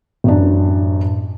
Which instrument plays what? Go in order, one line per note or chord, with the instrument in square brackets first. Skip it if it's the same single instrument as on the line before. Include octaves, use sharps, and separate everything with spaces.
[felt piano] A1 F#2 D4